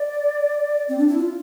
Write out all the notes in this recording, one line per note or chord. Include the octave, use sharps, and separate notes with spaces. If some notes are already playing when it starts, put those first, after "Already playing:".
Already playing: D5
C4
D4
E4
F4